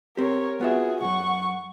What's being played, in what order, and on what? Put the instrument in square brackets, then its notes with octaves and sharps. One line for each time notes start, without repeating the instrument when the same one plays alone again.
[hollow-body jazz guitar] C4 G4 [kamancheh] A#4 C#5
[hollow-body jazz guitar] B3 F4 E5 [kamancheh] F#4 G#4
[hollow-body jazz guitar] B1 F#2 [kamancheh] F#5 C#6